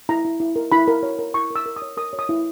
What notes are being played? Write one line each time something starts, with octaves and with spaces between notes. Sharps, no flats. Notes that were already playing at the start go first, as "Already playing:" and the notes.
E4 A#5
E4
E4
A#4
E4 B5
A#4
C#5
A#4
E4 C#6
A#4
E6
A#4
D#6
C#5
A#4 D#6
C#5
D#6
E4